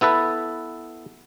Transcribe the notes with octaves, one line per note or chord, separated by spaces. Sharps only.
B3 E4 A4 B4